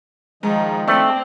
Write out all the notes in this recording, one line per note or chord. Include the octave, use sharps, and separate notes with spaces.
G#2 D#3 F3 D#4
A3 C4 D4